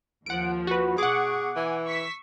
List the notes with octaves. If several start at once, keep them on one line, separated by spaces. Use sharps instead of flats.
D#2 F3 F#5 D7
F#4 B4
B2 G#4 F#5 C#6 D6
E3 G#5
C#6 E6 B6